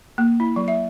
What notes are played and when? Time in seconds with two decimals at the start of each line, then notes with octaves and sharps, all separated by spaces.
0.18 A#3
0.40 E4
0.56 F#3
0.68 E5